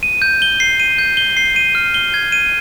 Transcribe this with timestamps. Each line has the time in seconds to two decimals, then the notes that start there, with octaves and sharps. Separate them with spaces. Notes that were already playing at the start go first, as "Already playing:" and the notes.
0.03 D#7
0.22 G6
0.42 G7
0.60 C7
0.80 D#7
0.98 G6
1.17 G7
1.37 C7
1.56 D#7
1.75 F6
1.94 G7
2.14 G#6
2.32 D#7